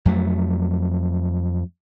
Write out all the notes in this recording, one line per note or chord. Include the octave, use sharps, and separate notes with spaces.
F2 F#3 A3